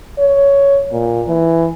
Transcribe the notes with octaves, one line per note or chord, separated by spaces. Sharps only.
C#5
A#2
E3